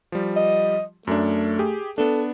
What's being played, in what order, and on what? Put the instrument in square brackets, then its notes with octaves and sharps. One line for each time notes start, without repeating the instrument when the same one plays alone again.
[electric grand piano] F3 G3
[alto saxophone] D#5
[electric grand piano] F#2 D4 [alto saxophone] A3
[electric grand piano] G4 G#4
[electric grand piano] B3 D4 [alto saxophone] A4